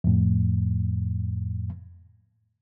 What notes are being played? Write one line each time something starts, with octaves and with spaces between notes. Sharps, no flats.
F2 A2